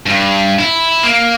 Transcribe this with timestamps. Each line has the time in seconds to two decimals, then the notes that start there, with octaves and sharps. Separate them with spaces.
0.06 G2
0.59 E4
1.03 A#3